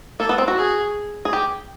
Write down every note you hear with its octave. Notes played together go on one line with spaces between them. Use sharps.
A#3 A4
B3
C4
F#4
G#4
G#4
G4